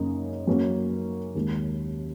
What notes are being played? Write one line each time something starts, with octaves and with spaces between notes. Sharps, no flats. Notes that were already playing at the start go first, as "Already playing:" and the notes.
Already playing: F#2 C#3 A#3 D#4
F#2 F#3 A#3 C#4 A#4
D#2 D#3 G#3